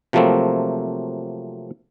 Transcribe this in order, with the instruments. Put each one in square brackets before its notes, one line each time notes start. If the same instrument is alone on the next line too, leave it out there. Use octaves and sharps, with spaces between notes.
[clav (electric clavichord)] C3 F3 F#3 A3 A#3 C4